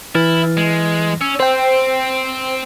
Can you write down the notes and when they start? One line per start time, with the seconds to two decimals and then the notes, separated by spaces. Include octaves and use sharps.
0.15 E3 E4 F6 A6
0.57 G#3
1.21 C#4 E6
1.40 C4 C5 G5